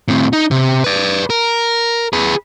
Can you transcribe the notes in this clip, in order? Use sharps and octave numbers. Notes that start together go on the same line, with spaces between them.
A2 C4
D#4
C3
B4 D5
A#4
G#4 B4